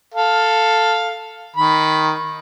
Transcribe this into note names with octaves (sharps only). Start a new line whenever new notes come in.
A4 F5
D#3 B5